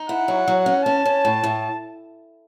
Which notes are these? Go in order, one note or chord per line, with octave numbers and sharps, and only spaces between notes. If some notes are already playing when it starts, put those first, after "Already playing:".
Already playing: D#4
E4 F#5
F#3
F#3
C#4
C#4 A5
C#4
A2
A2